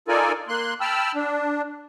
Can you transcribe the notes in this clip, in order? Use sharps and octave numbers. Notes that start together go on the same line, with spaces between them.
D#4 F4 A4 A#4 D5 G#5
A#3 C6 F#6
G5 A5 B5 E6 F6
D4